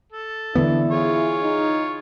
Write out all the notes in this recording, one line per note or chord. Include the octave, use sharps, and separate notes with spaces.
A4
D3 E3 B3 D4 E4
F4 G#4 C#5
D#4